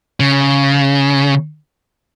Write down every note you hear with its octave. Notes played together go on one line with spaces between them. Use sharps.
C#3